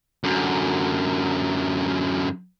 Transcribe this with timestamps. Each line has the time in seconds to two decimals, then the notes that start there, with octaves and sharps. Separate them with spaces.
0.24 F#2 D3